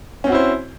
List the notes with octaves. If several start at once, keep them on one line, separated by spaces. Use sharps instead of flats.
C4 C#4 E4 F#4 C5